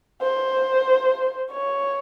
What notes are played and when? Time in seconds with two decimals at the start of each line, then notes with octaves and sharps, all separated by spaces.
0.21 C5
1.51 C#5